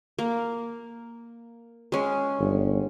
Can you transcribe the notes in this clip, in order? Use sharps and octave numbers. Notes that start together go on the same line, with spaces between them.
A#3
G#3 C#4
G1